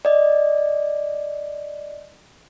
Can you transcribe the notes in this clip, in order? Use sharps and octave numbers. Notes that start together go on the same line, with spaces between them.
D5 D#5